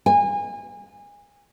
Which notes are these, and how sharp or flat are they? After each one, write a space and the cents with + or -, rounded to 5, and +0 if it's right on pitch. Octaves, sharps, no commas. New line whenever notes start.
G#5 -30